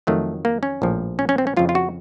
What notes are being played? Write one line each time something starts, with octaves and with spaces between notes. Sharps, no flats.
F2 D#3 F#3 A3
A#3
C#4
A#1 A2 F3
C#4
C#4
C4
C#4
F2 C#3 F3 F4
F4
F#4